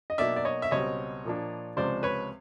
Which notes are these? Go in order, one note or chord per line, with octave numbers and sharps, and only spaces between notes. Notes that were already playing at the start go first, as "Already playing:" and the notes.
D#5
B2 F#3 A#3 D#4 D5 E5
D5
C#5 D#5
E5
C#2 B2 G3 C4 C#5 D#5
A#2 F3 A#3 D4
C#2 C3 F3 G#3 C#4 C5 D5
B4 C#5